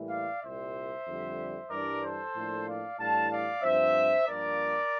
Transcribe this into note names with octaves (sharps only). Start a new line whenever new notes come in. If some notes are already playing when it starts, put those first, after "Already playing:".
Already playing: A2 E3 G3 A#3 E4
D5 F5
C2 A#2 G3 C5 E5
F2 D3 G3
G2 E3 G3 D4 A#4 D5
A4 C5
A2 F3 A#3 D4
D5 F5
A2 E3 G3 D4 F5 A5
D5 F5
G2 F3 C4 C5 E5
G2 F3 A#3 D4 A#4 D5